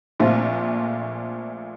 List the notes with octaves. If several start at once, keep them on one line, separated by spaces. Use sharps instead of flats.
A#1 A#2 A3 C4 F4